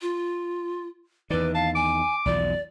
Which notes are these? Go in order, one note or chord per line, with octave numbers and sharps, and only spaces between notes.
F4
E2 D#3 B4 D5
F5 A5
G#5 D6
B1 E2 F3 D5